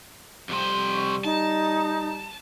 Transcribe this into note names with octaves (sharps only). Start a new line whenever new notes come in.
F2 C3 G3 C5
C#6
D#4 A5